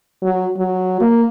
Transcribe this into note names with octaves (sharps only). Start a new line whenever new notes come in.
F#3
F#3
A#3